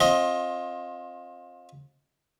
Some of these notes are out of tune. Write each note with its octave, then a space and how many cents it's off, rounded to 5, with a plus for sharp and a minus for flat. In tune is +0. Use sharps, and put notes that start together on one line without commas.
C4 +35 F4 +20 D#5 +10